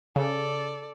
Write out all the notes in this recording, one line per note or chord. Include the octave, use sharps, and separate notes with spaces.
C#3 A4 D5